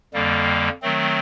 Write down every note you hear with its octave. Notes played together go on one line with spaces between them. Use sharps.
F2 D3 G3 A#3
D#3 F#3 A3 C4